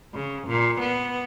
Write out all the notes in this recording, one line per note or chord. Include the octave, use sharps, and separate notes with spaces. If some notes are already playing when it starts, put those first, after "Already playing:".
C#3
A#2
B3